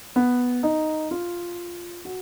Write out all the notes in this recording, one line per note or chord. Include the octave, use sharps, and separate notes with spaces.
B3
D#4
F4
F#4